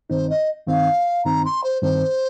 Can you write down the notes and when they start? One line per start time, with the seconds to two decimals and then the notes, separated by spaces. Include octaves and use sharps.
0.10 G2 D#3 C4 D#4 C5
0.29 D#5
0.67 G2 D#3 C4 D#4 F5
1.24 G2 D#3 C4 D#4 A#5
1.45 C6
1.63 C5
1.82 G2 D#3 C4 D#4 C5